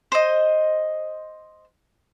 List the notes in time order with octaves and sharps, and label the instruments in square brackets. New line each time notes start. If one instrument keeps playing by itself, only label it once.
[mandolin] C5 D#5